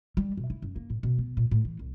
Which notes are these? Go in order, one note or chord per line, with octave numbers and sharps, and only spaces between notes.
G3
B2
E4
F#2
A#3
A2
B2
B3
A#2
A2
E3
C2